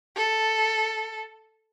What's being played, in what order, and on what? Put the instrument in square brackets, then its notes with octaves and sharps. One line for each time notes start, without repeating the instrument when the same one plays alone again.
[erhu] A4